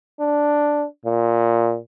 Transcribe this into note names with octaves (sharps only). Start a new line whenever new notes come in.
D4
A#2